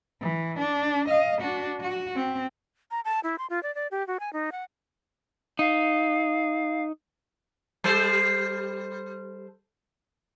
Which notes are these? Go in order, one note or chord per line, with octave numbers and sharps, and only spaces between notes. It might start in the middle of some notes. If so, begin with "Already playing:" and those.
E3
D4
D#5 F5
D4 F#4
F#4
C4
A#5
A5
E4
C6
F4
D5
D5
G4
F#4
G#5
D#4
F#5
D#4 F5
G3 A4 C5